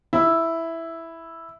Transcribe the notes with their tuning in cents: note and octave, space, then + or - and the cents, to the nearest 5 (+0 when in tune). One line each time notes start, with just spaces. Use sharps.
E4 +0